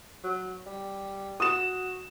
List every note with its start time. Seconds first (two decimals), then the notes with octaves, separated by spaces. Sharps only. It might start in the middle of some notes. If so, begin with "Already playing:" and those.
0.24 F#3
0.67 G3
1.40 F#4 D#6 E7